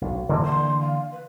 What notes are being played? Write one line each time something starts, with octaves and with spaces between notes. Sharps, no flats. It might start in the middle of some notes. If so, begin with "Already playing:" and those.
B1
D3 E3 A#3
C6
F5
B4